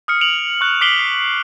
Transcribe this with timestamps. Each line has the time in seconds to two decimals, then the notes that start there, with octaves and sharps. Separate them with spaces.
0.08 D#6 F6 C#7
0.21 D7 F7 F#7
0.39 D7
0.61 C#6 F#6
0.81 D6 B6 C7 D7 F#7 G7
1.00 C7